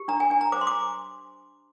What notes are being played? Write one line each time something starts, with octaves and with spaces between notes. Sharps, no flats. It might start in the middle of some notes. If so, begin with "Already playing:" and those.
Already playing: G4
D4 A#5
G#5
D4 G#5
A#5
C5 D6
C6
D6